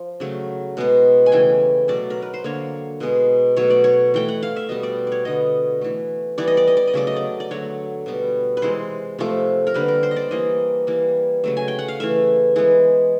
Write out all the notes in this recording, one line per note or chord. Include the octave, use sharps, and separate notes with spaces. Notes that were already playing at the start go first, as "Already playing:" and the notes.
Already playing: F3
C#3 F#3 A3
B2 G#3 B3
G#5
C#3 E3 A3 G5
B2 F#3 A3 D5
A#4
B4
C5
D3 F#3 A#3 C#5
B2 G#3 B3
B2 F#3 A3 C#5
D5
C#5
E3 A3 G5
F#5
F5
E5
B2 G3 B3 D#5
D5
C#5 D5
D3 G3 B3 D#5
E3 A3
E3 G3 B3 D5
D#5
D5
D#5
D5
D#5
C#3 F#3 A3 D5
D#5
D5
D5
D3 F#3 A3 C#5
B2 G3 B3
B4
C3 E3 G#3 C5
C3 F3 A3
A#4
D3 G3 A#3 B4
A#4
C5
D#5
D5
E3 G3 A#3 D#5
E3 G3 A#3
C#3 F#3 A3
G#5
G5
F#5
F5
E3 A3 E5
E3 G#3 B3